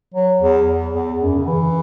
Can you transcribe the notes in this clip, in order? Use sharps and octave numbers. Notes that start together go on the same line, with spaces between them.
F#3
E2
E2
F#2
C#3
E3